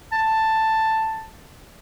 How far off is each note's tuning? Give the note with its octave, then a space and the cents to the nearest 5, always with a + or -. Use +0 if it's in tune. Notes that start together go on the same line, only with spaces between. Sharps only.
A5 +5